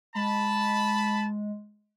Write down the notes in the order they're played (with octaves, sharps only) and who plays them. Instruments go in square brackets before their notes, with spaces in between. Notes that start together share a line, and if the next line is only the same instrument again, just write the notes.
[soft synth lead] G#3 [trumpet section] A5 B5